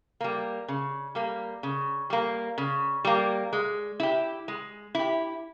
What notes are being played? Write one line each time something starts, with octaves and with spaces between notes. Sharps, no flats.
G3 A#3
C#3
G3 A#3
C#3
G3 A#3
C#3
G3 A#3
G#3
E4 G4
G#3
E4 G4